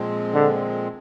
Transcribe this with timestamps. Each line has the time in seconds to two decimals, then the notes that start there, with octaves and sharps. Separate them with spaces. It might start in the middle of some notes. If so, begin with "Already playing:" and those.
Already playing: A#2 F3 G#3 C4
0.34 D3